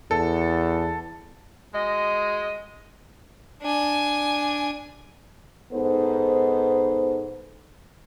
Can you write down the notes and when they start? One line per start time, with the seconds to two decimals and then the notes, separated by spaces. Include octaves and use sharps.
0.11 E2 A4
1.73 G#3 F#4 D#5
3.62 D4 G#5
5.72 G#2 B3 D#4 A4 C5